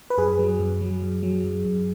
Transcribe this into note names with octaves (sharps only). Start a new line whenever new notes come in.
B4
F#2 G#4
F#3
F#2
F#3
F#2
F#3
F#2
F#2